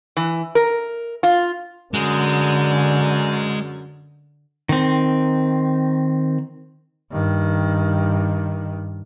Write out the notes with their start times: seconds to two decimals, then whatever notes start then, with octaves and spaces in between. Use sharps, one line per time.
0.17 E3
0.55 A#4
1.23 F4
1.94 F#2 D3 G#3
4.69 D#3 C4
7.12 G2 D#3